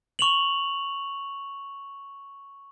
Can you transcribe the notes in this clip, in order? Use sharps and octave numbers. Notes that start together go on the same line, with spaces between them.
C#6 F7 F#7